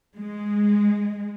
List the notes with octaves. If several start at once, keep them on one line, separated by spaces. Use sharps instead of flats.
G#3